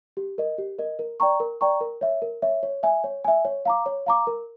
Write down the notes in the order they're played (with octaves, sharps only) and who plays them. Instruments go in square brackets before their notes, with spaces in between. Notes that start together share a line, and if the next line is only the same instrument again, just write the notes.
[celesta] G4
A#4 D#5
G4
A#4 D#5
A#4
D5 G5 A#5 C#6
A#4
D5 G5 A#5 C#6
A#4
C#5 E5
A#4
C#5 E5
C#5
E5 G#5
C#5
E5 G#5
C#5
F5 A#5 D6
C#5
F5 A#5 D6
A#4